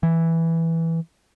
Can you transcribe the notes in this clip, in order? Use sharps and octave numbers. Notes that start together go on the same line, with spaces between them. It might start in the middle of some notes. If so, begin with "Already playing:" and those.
E3